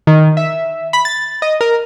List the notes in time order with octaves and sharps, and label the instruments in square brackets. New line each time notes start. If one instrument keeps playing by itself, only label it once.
[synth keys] D#3
E5
B5
A6
D#5
A#4